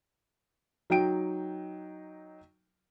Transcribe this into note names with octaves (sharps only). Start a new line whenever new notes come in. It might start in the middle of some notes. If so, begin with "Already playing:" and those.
F#3 D#4 G5 D7